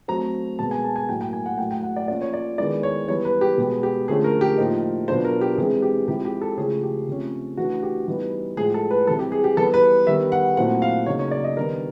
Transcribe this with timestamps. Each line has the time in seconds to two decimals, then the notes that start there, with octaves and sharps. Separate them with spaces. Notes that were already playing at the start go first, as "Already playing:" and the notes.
0.08 F#3 A3 C4 A#5
0.59 B2 G#3 B3 A5
0.71 G#5
0.84 A5
0.96 G#5
1.09 A2 F#3 A#3 G5
1.21 G5
1.33 G#5
1.46 F#5
1.58 A2 F#3 A3 G5
1.71 G5
1.83 F#5
1.96 D5
2.08 F3 A#3 C#4 F4 D5
2.21 C#5
2.33 D5
2.58 D#3 G#3 B3 E4 D5
2.83 C#5
3.08 E3 G3 B3 C#5
3.25 B4
3.41 G4
3.58 B2 G#3 B3
3.83 G4
4.08 D3 F3 A3 C#4 G#4
4.24 A#4
4.41 G4
4.58 A2 F3 A#3 D#4
5.08 B2 F#3 B3 D4 F4 C5
5.25 A#4
5.41 G4
5.58 C3 E3 G#3 G#4
5.82 G4
6.08 C3 F3 G#3 C4 E4 G4
6.25 G4
6.42 A4
6.57 C#3 F3 A3 C#4 E4 G#4
6.83 G4
7.08 C3 F3 A3 C#4
7.57 E3 A3 D4 F#4
7.83 G4
8.08 E3 G3 B3 D#4
8.57 A2 F3 G#3 G#4
8.74 A4
8.91 B4
9.07 C3 E3 G3 A4
9.19 G4
9.32 G#4
9.44 G4
9.57 E3 G3 B3 A4
9.74 B4
10.07 D#3 G3 B3 E5
10.32 F#5
10.57 A#2 F#3 A3 C4 E4 F#5
10.82 F5
11.06 C#3 F#3 A#3 D#4 C#5
11.19 C#5
11.31 D5
11.44 D#5
11.57 D#3 G3 B3 D4 A#4